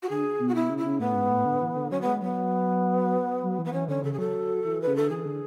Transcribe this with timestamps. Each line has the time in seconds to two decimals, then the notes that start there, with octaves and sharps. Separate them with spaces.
0.03 F#4
0.09 D3 G#4
0.39 B2
0.49 F#4
0.55 B2 E4
0.70 C#3
0.78 E4
0.85 C#3
1.00 A2 B3
1.15 G#2
1.30 A2
1.45 D3
1.61 E3
1.76 D3
1.91 F#3 C#4
2.01 B3
2.07 G#3
2.21 F#3 B3
3.43 F#3
3.59 E3
3.65 B3
3.73 E3 C#4
3.88 D3 C#4
4.03 C#3 A4
4.13 G#4
4.18 F#3 A4
4.65 E3
4.82 B4
4.87 C#3
4.96 D3 A4
5.09 E3 G#4
5.26 D3